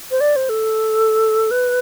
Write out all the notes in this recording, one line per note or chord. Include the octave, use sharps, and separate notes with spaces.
C5
D5
C5
A4
B4